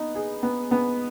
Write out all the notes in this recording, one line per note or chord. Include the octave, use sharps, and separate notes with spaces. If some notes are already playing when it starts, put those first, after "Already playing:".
Already playing: B3 D#4
G#4
B3
B3